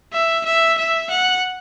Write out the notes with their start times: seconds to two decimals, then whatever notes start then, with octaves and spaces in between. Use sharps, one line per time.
0.13 E5
0.45 E5
0.78 E5
1.10 F#5